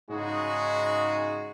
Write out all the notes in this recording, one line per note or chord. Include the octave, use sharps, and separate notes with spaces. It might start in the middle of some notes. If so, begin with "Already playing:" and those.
G#2 C#3 G#3 D#4 F#4 G#4